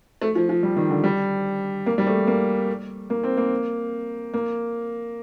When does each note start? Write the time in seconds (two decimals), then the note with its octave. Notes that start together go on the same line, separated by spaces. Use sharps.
0.22 A3
0.35 F3
0.49 F3
0.63 G3
0.77 D#3
0.90 D3
1.04 G3
1.86 A#3
1.98 G3
2.07 A3
2.27 A#3
3.10 A#3
3.23 C4
3.37 A#3
4.34 A#3